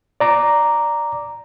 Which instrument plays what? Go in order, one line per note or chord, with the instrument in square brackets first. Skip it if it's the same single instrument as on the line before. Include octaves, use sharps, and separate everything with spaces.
[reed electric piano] D5 A#5 D6